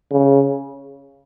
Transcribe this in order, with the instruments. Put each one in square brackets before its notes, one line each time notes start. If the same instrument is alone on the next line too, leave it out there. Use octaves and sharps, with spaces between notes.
[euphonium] C#3